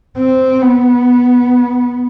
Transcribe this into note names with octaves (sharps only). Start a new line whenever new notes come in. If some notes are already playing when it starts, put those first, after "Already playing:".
C4
B3